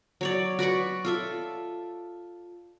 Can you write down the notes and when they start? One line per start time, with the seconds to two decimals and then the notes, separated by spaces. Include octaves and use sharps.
0.21 F#3 C#5 D5
0.59 F#4 B4 D5 C#6
1.05 F4 A4 E5